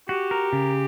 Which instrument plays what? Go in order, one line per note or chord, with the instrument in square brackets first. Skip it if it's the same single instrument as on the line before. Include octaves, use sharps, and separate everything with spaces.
[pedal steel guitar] F#4 [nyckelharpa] G4
[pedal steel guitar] A#4
C#3